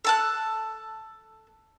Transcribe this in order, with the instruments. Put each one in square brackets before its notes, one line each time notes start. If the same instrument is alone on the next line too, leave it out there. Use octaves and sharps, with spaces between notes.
[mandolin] A4 A5 F#6